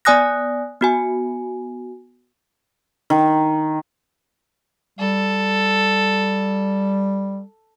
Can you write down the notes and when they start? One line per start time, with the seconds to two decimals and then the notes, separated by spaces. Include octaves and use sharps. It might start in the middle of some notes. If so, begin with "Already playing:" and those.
0.05 B3 D5 G#5 D#6 F#6 A#6
0.81 B3 F#4 G#5
3.10 D#3
4.99 G3 A4